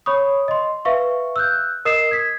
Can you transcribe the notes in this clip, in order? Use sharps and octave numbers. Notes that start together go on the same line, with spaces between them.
C#5 B5 C#6 D#6
D#5 C6
B4 E5 F5 C#6
E6 F#6 G6
A#4 D#5 D#6 C7 E7
G#6 B6